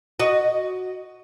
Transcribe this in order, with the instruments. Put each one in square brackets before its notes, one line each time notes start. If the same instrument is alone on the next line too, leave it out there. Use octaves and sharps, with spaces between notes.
[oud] F#4 D#5